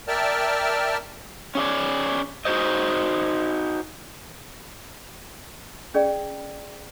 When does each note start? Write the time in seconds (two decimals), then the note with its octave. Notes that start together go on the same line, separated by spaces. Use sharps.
0.08 A#4 D5 E5 G5 A5 F6
1.55 C#4 G#4 D5
2.45 D#4 F#4 G#4 C5 D#5
5.94 C#4 G#4 D5 G5